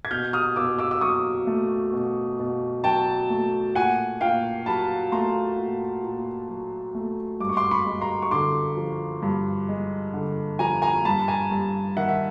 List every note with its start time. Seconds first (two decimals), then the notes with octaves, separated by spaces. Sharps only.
0.05 G#6
0.11 B2 F6 G6
0.33 D#6 F6
0.56 B2 D6 E6
0.79 D6 E6
0.91 E6
1.01 F#3 C#6 D#6
1.47 A3
1.93 B2
2.39 B2
2.84 F#3 G5 A5
3.30 A3
3.75 A#2 F#5 G#5
4.21 A#2 F5 G5
4.66 F#3 A5 B5
5.12 A3 A#5 C6
5.58 A#2
6.03 A#2
6.49 F#3
6.95 A3
7.40 G2 D6
7.49 C#6
7.57 C6 D6
7.71 B5 C#6
7.86 G#3
8.01 A#5 C6
8.22 C#6
8.31 D3 C6 D6
8.77 F3
9.22 G2
9.69 G#3
10.14 D3
10.59 F3 G#5 A#5
10.82 G#5 A#5
11.05 G2 A5 B5
11.28 G#5 A#5
11.51 G2
11.96 D#3 E5 F#5
12.09 E5